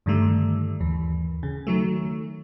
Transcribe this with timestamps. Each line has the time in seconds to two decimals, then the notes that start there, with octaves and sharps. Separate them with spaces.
0.06 G2 D3 D#3 G3 A3
0.80 D#2 E3
1.43 C#3
1.67 D#3 F#3 A3